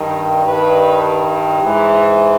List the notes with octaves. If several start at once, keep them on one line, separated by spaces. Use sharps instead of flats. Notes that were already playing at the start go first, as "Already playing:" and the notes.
Already playing: G2 D#3
G2 D#3 B4
G#2 E3